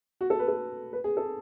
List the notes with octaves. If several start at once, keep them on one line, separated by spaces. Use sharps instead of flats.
F#4
A4
B4
A4
B4
G#4
A4